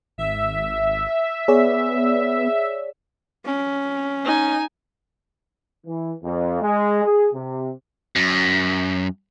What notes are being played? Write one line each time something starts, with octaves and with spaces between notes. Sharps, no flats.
G#1 E5
B3 G#4 C#5 D5
C#4
D#4 G#5
E3
F2
G#3
G#4
C3
F#2